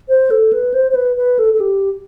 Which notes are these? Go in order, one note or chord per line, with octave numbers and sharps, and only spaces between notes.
C5
A4
B4
C5
C5
B4
B4
A4
A4
G4